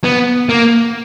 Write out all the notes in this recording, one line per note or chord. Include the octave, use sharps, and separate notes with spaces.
B3
A#3